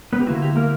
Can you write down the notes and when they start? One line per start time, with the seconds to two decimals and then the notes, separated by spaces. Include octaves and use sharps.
0.13 B3 B4
0.20 G4
0.26 D3 A#3 E4 F#4
0.42 G4
0.56 A#3 A#4